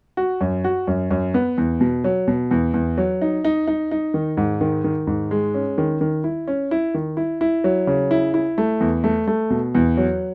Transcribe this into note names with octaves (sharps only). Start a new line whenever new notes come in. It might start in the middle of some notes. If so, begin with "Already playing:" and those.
F#4
F#2
F#4
F#2
F#2
B3
E2
B2
F#3
B2
E2
E2
F#3
D#4
D#4
D#4
D#4
D#3
G#2
D#3
D#3
G#2
G#3
C#4
D#3
D#3
E4
C#4
E4
D#3
E4
E4
F#3
C#3
E4
E4
A3
E2
A3
A3
B2
E2
F#3